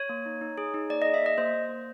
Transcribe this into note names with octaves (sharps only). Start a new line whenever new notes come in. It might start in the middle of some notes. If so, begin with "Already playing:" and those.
Already playing: C#5
A#3
D#4
D#4
G#4
D#4
A#3 D5
G#4 D#5
E5
A#3 D#5
A#3 C5
A#3
A#3